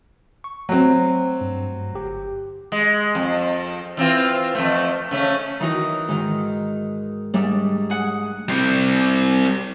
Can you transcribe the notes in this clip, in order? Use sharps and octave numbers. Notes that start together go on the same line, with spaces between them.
C#6
F#3 A3 C4
G2
G1 G4
G#3
F2
E3 C4 F4
F2 A3
C#3 A3 C#4
D#3 E3 D#4 F#4 D#5
G#2 D#3
G#2 G3 A3 D4
G#4 F#5
G3 C4